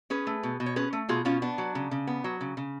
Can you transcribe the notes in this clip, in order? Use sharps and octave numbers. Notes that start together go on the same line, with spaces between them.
C#4 G#4 B4
A3
B2
B2
C#5
C#4 G#4 B4
A3
B2 F4 G#4
B2 C#4 F4
B3 D4
F#3
C#3
C#3
B3
F#3
C#3
C#3